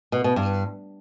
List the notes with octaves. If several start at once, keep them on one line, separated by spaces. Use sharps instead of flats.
B2
B2
G2